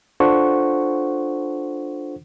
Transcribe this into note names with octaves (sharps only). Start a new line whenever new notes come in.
D4 F4 A4 C5 F#5 C#6